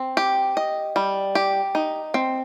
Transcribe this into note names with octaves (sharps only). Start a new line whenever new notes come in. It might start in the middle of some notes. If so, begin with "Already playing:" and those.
Already playing: C4
G4
D#5
G3
G4
D#4
C4